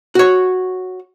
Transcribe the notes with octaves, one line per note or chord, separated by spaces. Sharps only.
F#4 C#5